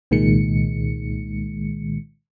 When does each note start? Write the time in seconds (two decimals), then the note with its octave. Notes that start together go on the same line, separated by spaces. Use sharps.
0.11 C2 A#2 D#3 G#3 C#7